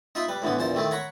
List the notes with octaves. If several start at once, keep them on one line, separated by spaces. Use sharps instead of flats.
D#4 F4 D#5 E5 B5
G3 B4
A2 D3 E3 B3
A#1 E2 C5 A5
D#3 A3 C4 E4
C#5 F#5 A#5 B5 C#6